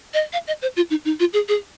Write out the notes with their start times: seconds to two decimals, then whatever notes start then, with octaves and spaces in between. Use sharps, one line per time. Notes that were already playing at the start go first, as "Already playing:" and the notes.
0.14 D#5
0.33 F5
0.47 D#5
0.62 C5
0.76 F4
0.90 D#4
1.05 D#4
1.20 F4
1.33 G#4
1.49 G#4